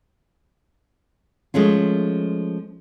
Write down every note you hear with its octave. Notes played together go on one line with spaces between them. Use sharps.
F3 G#3 A3 C#4 F4